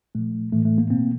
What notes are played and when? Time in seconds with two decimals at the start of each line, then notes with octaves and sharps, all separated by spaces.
0.15 A#2 F3 A3
0.52 A2 E3 A3
0.65 A3
0.78 A#3
0.90 B2 A#3 C4